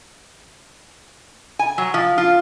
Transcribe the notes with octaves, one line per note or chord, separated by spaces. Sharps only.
G#5
F#3
F3
F4